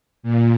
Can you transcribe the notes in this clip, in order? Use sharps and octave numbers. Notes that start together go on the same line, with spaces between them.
A#2